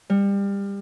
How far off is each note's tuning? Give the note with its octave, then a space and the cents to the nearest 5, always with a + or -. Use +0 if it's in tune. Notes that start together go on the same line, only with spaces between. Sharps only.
G3 +25